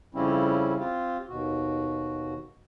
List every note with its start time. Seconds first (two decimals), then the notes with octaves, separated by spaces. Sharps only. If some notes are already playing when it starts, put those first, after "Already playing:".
0.15 F2 C#3 G3 C4 C#4 E4
0.79 C4 F4 G4
1.29 D#2 B2 F#4